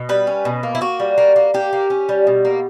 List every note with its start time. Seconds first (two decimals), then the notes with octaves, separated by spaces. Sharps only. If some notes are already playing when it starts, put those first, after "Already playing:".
Already playing: B2
0.09 G3 B4
0.27 C#4
0.45 B2
0.63 A#3
0.75 E4
0.81 A#3 F#4
1.00 G3
1.18 A#3
1.36 A#3
1.54 A#3 G4
1.73 A#3
1.90 C#4
2.09 G3
2.27 B2
2.45 A#3